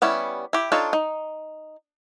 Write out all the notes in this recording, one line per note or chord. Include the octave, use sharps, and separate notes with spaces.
G3 B3 C#4 E4
E4 G4
D4 D#4 F4 A4 C#5
D#4